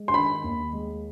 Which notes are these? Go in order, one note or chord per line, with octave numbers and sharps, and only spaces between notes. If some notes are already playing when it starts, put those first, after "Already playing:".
Already playing: G#3
C6
D#3 B5
D#2
G#3